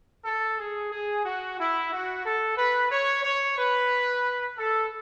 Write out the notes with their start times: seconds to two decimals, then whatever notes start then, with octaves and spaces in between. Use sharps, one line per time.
0.24 A4
0.58 G#4
0.91 G#4
1.24 F#4
1.57 E4
1.90 F#4
2.24 A4
2.57 B4
2.90 C#5
3.23 C#5
3.56 B4
4.56 A4